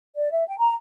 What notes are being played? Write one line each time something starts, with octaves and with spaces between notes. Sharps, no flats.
D5
E5
G5
A#5